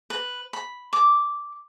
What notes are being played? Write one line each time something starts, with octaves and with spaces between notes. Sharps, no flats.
B4
B5
D6